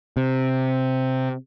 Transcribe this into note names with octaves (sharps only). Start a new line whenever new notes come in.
C3